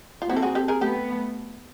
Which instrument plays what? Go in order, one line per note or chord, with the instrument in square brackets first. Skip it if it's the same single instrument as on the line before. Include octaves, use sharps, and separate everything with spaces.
[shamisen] F4
[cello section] A#3 C4 [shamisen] E4 F#4
[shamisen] A4
F#4 G#4
G4 A4
G#4 A#4
[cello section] A3 B3 [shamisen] G4 A4